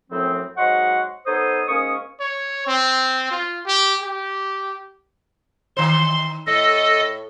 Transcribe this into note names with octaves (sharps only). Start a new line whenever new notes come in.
F#2 A2 F3 C4
G#2 F#3 D#5 F#5 C6 C#6
B3 D#4 A4 C5 C#5 D#6
G#2 A#3 C#4 C#6 D#6
C#5
C4
F4
G4
G4
D#3 C5 C6
A2 A4 D#5